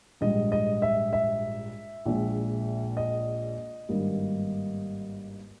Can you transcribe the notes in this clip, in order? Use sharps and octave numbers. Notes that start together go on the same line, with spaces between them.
A#1 G#2 G3 D#5
D#5
E5
E5
A#1 A#2 G#3
D#5
G#1 G2 G3 A#3